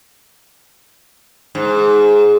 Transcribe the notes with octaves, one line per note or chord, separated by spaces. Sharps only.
G#2